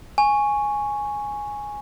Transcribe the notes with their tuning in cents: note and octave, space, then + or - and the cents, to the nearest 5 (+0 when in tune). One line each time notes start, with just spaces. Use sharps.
G#5 +0 C#6 +0